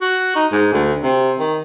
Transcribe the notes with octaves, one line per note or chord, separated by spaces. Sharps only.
F#4
D#4
G#2
D2
C3
D#3